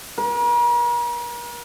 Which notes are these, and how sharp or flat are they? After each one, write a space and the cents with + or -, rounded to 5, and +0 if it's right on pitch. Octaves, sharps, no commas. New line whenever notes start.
A#4 +45